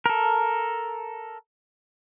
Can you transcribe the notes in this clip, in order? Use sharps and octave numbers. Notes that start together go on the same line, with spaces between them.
A4 A#4